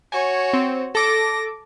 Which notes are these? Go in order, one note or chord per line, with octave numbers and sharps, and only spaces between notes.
F#4 C#5 G#5
C4
A4 D6 A#6